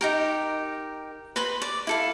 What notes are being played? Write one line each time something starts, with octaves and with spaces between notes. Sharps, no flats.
D#4 G4 A#4
B4 B5 C6
D5
E4 A4 F5